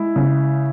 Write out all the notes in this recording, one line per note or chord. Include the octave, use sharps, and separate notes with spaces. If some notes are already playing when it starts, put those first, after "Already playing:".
Already playing: G#3 E4
C#3